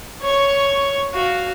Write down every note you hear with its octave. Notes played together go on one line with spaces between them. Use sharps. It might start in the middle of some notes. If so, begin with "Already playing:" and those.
C#5 C#6
F#4 F5